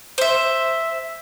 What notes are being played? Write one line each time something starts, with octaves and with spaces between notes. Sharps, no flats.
C5 E5